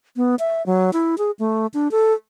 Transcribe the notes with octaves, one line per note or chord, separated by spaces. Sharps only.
B3
E5
F#3
E4
G#4
A3
D4
A4